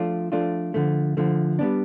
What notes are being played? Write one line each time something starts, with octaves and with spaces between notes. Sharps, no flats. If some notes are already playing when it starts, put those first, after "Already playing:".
Already playing: F3 A3 D4 F4
F3 A3 D4 F4
D3 F3 A3
D3 F3 A3
G3 B3 D4